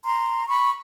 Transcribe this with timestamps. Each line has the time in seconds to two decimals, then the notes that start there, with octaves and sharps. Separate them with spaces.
0.04 A#5 C6
0.47 B5 C#6